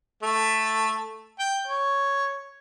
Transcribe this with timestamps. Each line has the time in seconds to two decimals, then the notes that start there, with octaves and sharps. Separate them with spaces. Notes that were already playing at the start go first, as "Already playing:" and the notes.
0.23 A3
1.40 G5
1.67 C#5